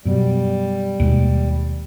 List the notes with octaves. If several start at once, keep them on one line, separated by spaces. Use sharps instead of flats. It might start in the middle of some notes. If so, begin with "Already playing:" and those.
F#2 B2 G3
D#2 B2 G#3